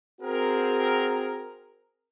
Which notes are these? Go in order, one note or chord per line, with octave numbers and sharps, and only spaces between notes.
C4 F#4 G#4 A#4